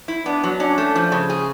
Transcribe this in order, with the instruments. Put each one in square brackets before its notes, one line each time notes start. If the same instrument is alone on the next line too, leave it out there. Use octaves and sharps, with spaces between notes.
[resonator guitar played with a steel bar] E4
[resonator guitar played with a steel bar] B3 [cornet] D4
[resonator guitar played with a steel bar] F#3
[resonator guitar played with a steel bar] C#4 [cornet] D4
[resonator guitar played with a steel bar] A3
F3
C#3
G#4